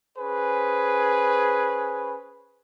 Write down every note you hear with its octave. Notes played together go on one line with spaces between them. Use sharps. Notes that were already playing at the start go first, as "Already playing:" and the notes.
C#4 G#4 B4 C5